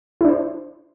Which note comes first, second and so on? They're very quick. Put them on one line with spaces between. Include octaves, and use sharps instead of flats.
E4 D4 C5